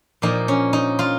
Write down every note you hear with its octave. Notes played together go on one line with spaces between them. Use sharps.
A#2 F3 A#3 D#4
C#4
D#4
F4